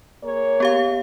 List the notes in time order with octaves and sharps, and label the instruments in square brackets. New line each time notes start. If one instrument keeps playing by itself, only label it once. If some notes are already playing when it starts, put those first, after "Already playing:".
[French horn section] A#3 G#4 C#5
[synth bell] B3 G4 F5